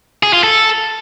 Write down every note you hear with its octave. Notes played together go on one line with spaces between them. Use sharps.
G#4
F4
A4